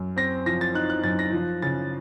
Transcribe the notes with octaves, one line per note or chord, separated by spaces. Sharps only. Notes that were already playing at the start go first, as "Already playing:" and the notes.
Already playing: F#2
C4 A#6
F3 A#6
A6
D#4 F#6
F#6
F#2 A6
A#6
F3
C#3 A6